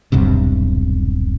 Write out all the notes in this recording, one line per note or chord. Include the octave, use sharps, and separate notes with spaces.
D#1 B1 G2 C3